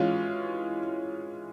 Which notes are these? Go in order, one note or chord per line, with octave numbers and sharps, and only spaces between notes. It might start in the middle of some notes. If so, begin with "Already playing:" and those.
Already playing: E3 G#3 C#4 F4